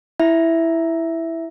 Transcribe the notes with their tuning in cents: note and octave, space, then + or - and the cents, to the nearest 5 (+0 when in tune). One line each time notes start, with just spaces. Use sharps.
E4 +0 E5 +0